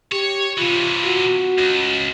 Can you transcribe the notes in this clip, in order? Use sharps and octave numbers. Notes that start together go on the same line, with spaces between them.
G4 C#5
C3 E3 F4
F#4
C#2